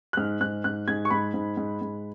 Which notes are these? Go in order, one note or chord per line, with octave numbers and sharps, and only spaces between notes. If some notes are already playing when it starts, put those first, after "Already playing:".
F#6
G#2 F6
G#2 F#6
G#2 F#6
G#2 G#6
C#6
G#2 B5
G#2
G#2
G#2